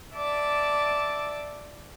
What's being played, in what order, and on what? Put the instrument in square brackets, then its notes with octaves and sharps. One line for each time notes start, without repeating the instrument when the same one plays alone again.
[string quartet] D5 E5 A5 D6